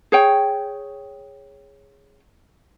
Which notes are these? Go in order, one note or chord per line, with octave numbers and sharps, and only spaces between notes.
G#4 C#5 G5